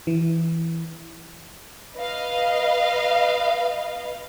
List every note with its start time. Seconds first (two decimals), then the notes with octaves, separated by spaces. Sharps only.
0.07 E3
1.96 B4 D#5 F5